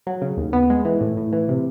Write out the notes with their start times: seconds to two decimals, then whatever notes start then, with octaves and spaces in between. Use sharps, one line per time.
0.07 F#3
0.22 C#3
0.37 D#2
0.53 B3
0.70 G#3
0.85 E3
1.01 A2
1.17 A2
1.32 E3
1.49 C3